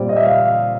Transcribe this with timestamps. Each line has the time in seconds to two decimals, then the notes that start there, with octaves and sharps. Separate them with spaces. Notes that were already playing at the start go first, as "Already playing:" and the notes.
Already playing: A#2 G3 C4 D5
0.09 D#5
0.17 E5
0.25 F5